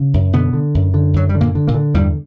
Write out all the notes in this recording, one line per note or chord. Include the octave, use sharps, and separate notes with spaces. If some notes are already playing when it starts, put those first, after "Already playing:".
Already playing: C#3
F#2
B2 D3 B3
D3
F#2
D3
F#2 F#3
G3
D3
A#2 A#3
D3
A#2 A#3
D3
E2 G2 G3